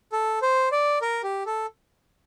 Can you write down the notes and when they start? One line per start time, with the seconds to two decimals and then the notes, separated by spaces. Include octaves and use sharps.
0.12 A4
0.42 C5
0.72 D5
1.02 A#4
1.23 G4
1.46 A4